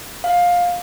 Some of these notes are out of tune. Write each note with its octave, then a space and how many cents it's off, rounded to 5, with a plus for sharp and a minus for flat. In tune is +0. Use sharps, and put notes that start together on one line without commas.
F5 +15